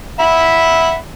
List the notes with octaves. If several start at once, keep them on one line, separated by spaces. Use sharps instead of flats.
E5 F#5 B5